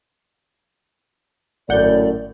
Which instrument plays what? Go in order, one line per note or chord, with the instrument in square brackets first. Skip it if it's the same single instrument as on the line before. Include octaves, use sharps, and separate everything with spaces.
[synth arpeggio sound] G#1 F#5 G6 [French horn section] F#2 A2 [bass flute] D5